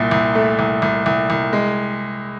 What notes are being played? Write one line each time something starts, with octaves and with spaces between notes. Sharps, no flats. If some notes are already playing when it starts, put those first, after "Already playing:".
Already playing: C2 A#2
C2
A3
C2
C2
C2
C2
G#3